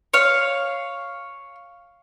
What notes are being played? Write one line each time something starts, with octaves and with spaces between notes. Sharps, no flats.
C#5 F5